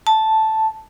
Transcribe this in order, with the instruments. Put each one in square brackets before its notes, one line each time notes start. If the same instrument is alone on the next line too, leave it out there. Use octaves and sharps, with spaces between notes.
[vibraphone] A5